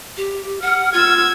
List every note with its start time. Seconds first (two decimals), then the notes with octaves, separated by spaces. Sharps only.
0.17 G4
0.62 F#5 F6
0.94 F4 E6 G#6